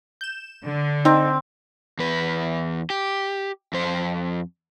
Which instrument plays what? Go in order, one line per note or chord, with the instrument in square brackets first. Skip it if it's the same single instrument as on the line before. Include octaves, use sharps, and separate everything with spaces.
[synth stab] G6 E7
[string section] D3
[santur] C4 [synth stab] D#4
[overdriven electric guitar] E2 B4
G4
F2 C5